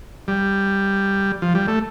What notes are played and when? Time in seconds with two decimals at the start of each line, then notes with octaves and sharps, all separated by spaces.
0.28 G3
1.42 F3
1.55 G3
1.68 A3